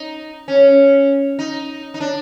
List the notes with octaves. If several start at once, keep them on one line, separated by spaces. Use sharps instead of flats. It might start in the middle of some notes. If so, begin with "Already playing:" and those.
Already playing: D#4
C#4
D#4
D#4
D4